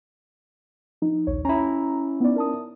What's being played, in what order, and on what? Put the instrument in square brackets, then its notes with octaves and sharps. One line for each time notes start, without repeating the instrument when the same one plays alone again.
[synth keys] F3 D#4
A#1 D#2 C#5
[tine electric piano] C#4 E4 [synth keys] A#5
[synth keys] B3 D#4 D5
A#4 A5 D#6